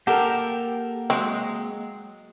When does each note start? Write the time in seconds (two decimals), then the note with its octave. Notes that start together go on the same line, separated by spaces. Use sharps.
0.07 A#3 G4 A4 A#4 F#5 G5
1.10 F#3 G#3 C4